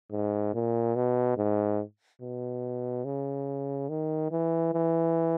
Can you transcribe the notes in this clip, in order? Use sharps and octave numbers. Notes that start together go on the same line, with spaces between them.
G#2
A#2
B2
G#2
B2
C#3
D#3
E3
E3